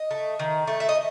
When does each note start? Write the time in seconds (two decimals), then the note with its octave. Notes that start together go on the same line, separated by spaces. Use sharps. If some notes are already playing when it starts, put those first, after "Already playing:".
Already playing: D#5
0.11 A3
0.39 D#3
0.67 A3
0.80 E5
0.89 D#5